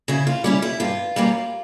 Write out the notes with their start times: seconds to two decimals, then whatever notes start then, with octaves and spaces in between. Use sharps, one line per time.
0.08 C#3 E4
0.27 F4
0.44 G3 C#4 E4 G4
0.62 E4
0.80 G2 F4
1.16 G3 A#3 C#4